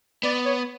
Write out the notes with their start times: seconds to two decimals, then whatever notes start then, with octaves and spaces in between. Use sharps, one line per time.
0.23 B3 D5
0.45 C#5